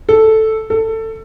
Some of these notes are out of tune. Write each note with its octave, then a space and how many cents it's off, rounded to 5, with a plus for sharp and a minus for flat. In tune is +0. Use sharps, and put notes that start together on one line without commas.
A4 +0
A4 +20